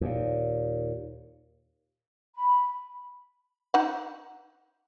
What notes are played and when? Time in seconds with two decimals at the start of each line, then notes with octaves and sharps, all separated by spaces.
0.01 D#2 A#2
2.36 B5
3.74 D#4 F#5